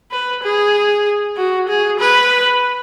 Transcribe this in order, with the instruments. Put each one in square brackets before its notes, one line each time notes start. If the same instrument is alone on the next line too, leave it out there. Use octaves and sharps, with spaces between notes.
[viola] B4
G#4
F#4
G#4
B4